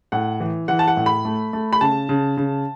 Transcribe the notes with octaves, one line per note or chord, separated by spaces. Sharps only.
A2 F#5
E3
E3 F#5
A5
F#5
A2
B5
A3
A3
B5
C#3 A5
C#3
C#3